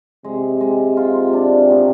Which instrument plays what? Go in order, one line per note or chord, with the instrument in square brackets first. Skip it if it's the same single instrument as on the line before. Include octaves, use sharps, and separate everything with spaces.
[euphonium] C3 [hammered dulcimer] G#3
[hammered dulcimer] G#3
F4
D4
B2